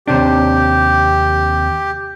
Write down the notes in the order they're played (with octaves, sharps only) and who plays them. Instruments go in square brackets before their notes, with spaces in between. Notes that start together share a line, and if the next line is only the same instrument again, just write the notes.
[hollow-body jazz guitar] D#2 C3 D4 [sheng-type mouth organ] G4